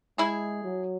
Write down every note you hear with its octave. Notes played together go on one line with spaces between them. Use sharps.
G#3 E4 G#4
F#3